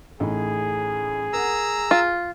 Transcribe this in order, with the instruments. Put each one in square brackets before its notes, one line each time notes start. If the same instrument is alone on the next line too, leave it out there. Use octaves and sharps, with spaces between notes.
[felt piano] A1 A2 D#4 [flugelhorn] G#4
[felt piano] A#4 F#5 [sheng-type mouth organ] A#5 E6
[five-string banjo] F4